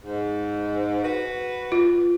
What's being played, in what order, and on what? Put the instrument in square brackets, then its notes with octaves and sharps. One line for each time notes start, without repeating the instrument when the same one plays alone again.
[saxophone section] G#2
F#4 B4
[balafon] F4